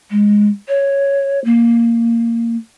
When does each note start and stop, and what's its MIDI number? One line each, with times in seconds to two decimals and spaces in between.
0.10 0.49 56
0.68 1.39 73
1.44 2.56 58